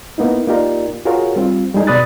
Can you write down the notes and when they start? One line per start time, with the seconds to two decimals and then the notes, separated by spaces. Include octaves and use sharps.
0.18 A#3 B3 D#4 E4
0.47 A#3 D#4 F4 G4 A#4 D5
1.05 F4 F#4 G#4 A#4 C#5 F5
1.36 G3 C4 F4
1.75 G3 G#3 D#4 G#4 A4
1.87 B2 D5 B5 D#6 F#6 A6